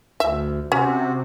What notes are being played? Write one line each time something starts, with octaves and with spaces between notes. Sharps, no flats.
D2 E5
C3 C#4 F#4